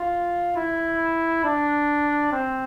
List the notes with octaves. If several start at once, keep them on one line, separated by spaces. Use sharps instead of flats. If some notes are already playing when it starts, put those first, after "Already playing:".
Already playing: F4
E4
D4
C4